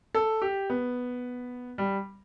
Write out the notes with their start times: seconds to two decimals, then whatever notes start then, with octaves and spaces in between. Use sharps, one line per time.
0.15 A4
0.42 G4
0.70 B3
1.78 G3